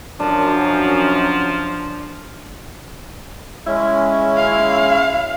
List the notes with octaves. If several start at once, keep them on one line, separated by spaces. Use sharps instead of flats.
F#2 F3 D4
G#3 C#4 E4
F5